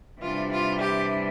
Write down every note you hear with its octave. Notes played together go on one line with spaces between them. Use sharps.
C3 E3 G3 D4 F4
F4
G4